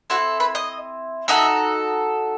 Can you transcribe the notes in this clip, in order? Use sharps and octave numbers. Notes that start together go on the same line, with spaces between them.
C4 E4 F#4 A4 F#5
B4 B5
D#5 D#6
D#4 F#4 A4 E5 E6